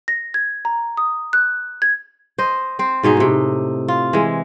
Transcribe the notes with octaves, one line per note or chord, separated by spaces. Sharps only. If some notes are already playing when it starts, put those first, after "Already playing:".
A#6
G#6
A#5
D#6
F#6
G#6
C5 D#5
C4 C5
G#2 B2 D#4 G#4
A2 C3
F4
E3 G#3